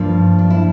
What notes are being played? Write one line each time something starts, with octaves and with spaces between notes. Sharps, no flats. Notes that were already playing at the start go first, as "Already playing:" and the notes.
Already playing: G2 F3 A#3
D4
E4